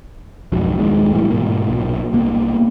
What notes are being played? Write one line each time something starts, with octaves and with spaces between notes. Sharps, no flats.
B1 F2 G#2 F#3
D#1 A#2 D#3 G#3
A2 E3 G3
G#2 B2 A#3
B1 A#2
C2 A#3 B3